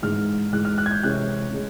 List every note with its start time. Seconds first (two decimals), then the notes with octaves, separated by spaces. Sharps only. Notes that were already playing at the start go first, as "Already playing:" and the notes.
0.02 G#2 E3 G#3 F6
0.52 G#2 E3 G#3 F#6
0.65 F6
0.78 F#6
0.86 G#6
0.91 G6
1.03 C3 E3 G#3 C#4 F#6
1.53 G#3 C#4